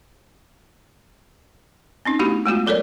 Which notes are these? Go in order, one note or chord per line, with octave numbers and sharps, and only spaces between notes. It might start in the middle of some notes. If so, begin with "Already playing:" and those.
C4 C#4 D#4
A3 B3 D4 E4 F#4 G4
G#3 A3 B3 F4 F#4
F#3 A4 A#4 C#5 D5